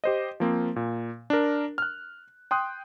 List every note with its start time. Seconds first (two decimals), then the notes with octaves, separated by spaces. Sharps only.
0.04 G4 C5 D#5
0.40 F3 A#3 C4
0.76 A#2
1.30 D4 A#4
1.78 F6 F#6
2.51 G5 C6 D#6 F#6